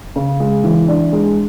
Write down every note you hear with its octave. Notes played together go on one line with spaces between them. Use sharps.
C#3
G#3
E3
D4
G#3